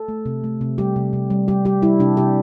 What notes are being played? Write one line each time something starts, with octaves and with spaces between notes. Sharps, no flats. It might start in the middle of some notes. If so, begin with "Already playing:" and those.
Already playing: A4
A3
C3
A3
C3
G3 G4
C3
C3
G3
G3 G4
G3 G4
G3 E4
C3 D4
C3 G4